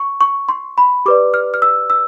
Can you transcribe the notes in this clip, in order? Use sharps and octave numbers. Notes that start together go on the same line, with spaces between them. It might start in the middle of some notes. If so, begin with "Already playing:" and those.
Already playing: C#6
C#6
C6
B5
G4 B4 D5 D6
F6
F6
E6
E6